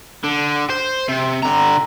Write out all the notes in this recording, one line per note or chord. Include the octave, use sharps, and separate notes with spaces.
D3
C5
C3
D3 A#5